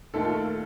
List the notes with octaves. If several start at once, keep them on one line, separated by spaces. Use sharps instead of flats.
D#2 D#3 A3 A4
F4
A4
A4